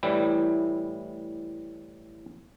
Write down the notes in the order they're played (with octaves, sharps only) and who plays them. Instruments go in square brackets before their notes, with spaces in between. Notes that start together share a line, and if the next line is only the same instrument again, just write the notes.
[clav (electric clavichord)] A2 E3 G3 E4